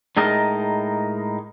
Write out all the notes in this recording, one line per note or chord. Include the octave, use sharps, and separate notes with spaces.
A2 G#3 D#4 A#4 D#5 A5